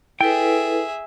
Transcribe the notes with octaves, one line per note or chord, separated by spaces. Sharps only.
E4 G#4 A4 B4 E5 G5